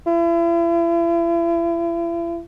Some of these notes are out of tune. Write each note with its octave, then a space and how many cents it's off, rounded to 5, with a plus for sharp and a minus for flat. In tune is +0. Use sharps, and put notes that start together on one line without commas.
E4 +40